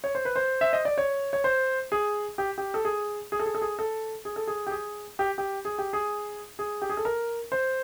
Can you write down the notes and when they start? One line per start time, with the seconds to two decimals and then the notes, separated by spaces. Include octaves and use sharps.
0.04 C#5
0.15 C5
0.25 B4
0.36 C5
0.61 E5
0.73 D#5
0.85 D5
0.98 C#5
1.33 C#5
1.44 C5
1.92 G#4
2.38 G4
2.58 G4
2.74 A4
2.85 G#4
3.32 G#4
3.39 A4
3.46 G#4
3.54 A4
3.62 G#4
3.79 A4
4.25 G#4
4.36 A4
4.47 G#4
4.67 G4
4.71 G#4
5.19 G4
5.38 G4
5.65 G#4
5.78 G4
5.93 G#4
6.59 G#4
6.82 G4
6.90 G#4
6.97 A4
7.05 A#4
7.52 C5